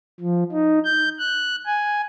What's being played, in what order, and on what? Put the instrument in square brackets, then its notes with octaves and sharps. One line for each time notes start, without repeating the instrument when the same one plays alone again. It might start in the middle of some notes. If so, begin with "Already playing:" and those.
[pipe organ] F3
D#4
G6
F#6
G#5